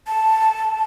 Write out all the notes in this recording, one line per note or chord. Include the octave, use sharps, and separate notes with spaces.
A5